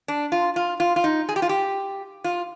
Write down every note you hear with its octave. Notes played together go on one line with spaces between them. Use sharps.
D4
F4
F4
F4
F4
D#4
G#4
G4
F4
G4
F4